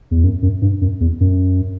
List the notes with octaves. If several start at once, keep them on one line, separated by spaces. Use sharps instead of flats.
E2
F#2
F#2
G2
F#2
E2
F#2